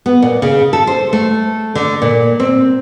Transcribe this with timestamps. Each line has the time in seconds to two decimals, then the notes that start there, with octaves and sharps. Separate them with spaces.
0.06 B3
0.22 A#2
0.42 C#3
0.73 A4
0.87 C5
1.13 A3
1.75 D3
2.02 A#2
2.40 C4